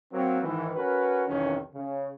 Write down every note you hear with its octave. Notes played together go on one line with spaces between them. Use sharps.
F#3 A#3 C4
G#2 D#3 E3
C#4 F#4 A#4 B4
C2 F2 C3 D#3 E3 C#4
C#3